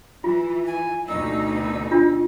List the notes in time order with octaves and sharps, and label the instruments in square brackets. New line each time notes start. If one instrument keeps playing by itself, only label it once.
[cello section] E3 [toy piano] F4
[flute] G#5
[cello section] D2 B2 D#4 [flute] E6
[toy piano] D4 F4